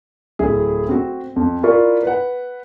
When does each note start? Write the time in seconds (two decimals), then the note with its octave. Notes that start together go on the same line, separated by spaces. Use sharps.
0.39 D1 E4 G#4
0.89 C4 F#4
1.36 F2
1.63 E4 F4 A#4 D5 C#6
2.03 B4 F#5